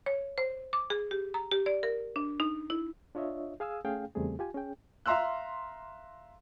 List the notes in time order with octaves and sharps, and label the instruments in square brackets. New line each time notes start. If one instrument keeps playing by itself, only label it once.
[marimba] C#5
C5
D6
G#4
G4
A#5
G4
D5
A#4
D4
D#4
E4
[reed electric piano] D4 F4 C#5 D#5 E5
G#4 F5 G#5 D#6 E6
A3 C#4 G#4 F5 G5
E2 C#3 G3 A3 C4 G#4
F4 G4 G#5
C#4 G#4 G5
[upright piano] E5 F5 A#5 C6 E6 F#6